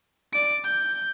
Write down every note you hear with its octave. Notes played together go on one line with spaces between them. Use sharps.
D5 D7
G6